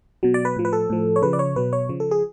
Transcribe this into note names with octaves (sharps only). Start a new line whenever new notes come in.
B2 F#3
D5
B4
A2 F3
B4
A4
A2 F3
C#5
C#3 F3 B4
D5
C#5
B2 F#3 B4
C#5
C#3 F3
A4
G#4